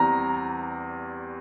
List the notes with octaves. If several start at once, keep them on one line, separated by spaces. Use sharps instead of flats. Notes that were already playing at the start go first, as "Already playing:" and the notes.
Already playing: E2 E3 G3 C4 A#5